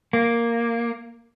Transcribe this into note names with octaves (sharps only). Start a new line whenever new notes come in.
A#3